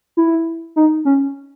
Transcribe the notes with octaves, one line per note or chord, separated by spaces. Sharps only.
E4
D#4
C#4